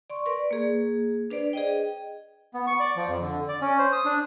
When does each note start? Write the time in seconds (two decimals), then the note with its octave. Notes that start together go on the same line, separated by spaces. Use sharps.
0.10 D5 C6 C#6
0.26 A#4 B4 D5
0.51 A#3 G#4
1.30 D4 B4 C5 D5
1.53 G#4 D#5 G5
2.54 B3
2.67 C#6
2.80 D5
2.96 F3
3.08 F2
3.22 D3
3.48 D5
3.61 C#4
3.78 C5
3.93 D#6
4.05 D4